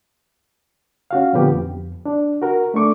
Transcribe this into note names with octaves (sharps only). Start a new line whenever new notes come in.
C#4 F#4 F5
A#2 D3 F3 B3 G4
F2
D4
F#4 A#4
A3 D4 C#6 D6